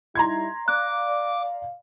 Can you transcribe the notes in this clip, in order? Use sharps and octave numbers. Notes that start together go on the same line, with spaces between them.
G3 D#4 E4 A#5 C6 G#6
D5 F5 D6 F#6